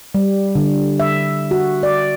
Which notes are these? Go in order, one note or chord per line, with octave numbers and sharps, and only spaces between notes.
G3
D3
E5
F#4
D5